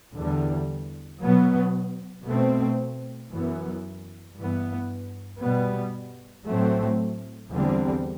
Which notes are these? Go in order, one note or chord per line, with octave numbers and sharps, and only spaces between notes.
E2 D3 G3
B2 F#3 B3
B2 A3 C4
F#2 E3 B3
G2 E3 B3
B2 G3 B3
A2 F#3 A3 C4
E2 D3 G3 C4